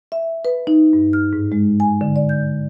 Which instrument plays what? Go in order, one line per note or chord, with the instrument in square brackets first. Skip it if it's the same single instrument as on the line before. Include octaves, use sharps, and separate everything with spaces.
[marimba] E5
B4
D#4
G2
F6
G#2
G#3
G#5
D3
D5
G6